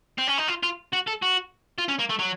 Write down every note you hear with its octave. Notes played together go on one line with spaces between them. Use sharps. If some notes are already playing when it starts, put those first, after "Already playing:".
C4
C#4
D#4
F4
F4
F#4
A4
F#4
F4
C#4
A#3
A3
F#3